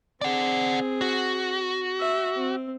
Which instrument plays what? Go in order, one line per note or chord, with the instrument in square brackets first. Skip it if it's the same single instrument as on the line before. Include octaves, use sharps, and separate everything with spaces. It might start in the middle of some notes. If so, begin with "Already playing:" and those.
[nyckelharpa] C4 G#4 [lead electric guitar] D5 F#5
[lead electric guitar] F#4
[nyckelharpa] E5
C4